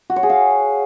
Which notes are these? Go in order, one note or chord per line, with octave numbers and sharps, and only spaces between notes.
F#4
C#5
G#4
F5